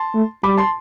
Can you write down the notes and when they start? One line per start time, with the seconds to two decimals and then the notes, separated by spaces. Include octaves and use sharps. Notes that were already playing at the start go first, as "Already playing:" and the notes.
Already playing: A5 C6
0.15 A3
0.43 G3 B5 D6
0.57 A5 C6